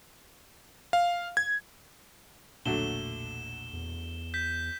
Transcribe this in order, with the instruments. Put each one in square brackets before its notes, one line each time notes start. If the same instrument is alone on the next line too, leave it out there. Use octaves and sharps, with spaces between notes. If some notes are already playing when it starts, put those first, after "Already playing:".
[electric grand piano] F5
G#6
[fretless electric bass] E1 A#1 A#2 [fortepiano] D3 F#3 A3 [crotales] E7 G7
[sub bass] E2
[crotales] G6 B6